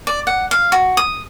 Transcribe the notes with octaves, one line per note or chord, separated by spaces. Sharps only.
D5
F#5
F5
F#4
D#6